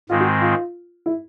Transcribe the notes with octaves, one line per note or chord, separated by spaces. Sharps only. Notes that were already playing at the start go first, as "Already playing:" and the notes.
G#2 D#3 G#3 C4 F4
F#4
F4
E4